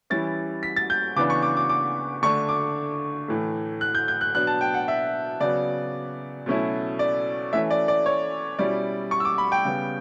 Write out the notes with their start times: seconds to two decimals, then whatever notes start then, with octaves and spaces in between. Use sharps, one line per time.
0.10 E3 G3 C#4 E4 A6
0.63 B6
0.76 A6
0.90 G6
1.16 C#3 E3 B3 D4 D6
1.30 C#6
1.43 D6
1.57 D6
1.69 D6
2.23 D3 A3 D4 C#6
2.49 D6
3.28 A2 E3 A3
3.81 F#6
3.95 G6
4.08 G6
4.21 F#6
4.35 B2 F#3 B3 D4 F#6
4.47 A5
4.61 G5
4.74 F#5
4.88 E5
5.40 C#3 F#3 B3 D5
6.46 B2 F#3 A3 C#4 E4
6.99 D5
7.53 E3 A3 C#4 E5
7.70 D5
7.88 D5
8.06 C#5
8.58 B2 G3 C#4 E4 D5
9.11 C#6
9.20 E6
9.25 D6
9.38 B5
9.52 G5
9.65 C#3 G3 B3